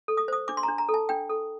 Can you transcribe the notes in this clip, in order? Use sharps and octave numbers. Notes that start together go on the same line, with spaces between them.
A4
D#6
C5 D#6
D4 D6
C6
D4 A#5
A#5
A4
A5
D4 G5
A4